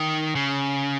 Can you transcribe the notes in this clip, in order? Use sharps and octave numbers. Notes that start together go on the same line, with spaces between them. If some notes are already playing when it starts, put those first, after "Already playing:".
Already playing: D#3
C#3